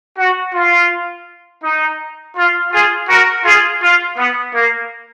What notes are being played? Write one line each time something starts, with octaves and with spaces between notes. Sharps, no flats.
F#4
F4
D#4
F4
F4 G#4
F#4 A#4
F4 G#4
F4
B3
A#3